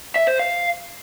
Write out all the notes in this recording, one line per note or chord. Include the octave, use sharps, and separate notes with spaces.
E5
C5
F5